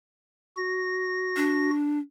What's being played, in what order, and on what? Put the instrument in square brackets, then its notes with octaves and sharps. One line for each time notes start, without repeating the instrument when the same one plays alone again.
[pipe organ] F#4 A#6
[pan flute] D4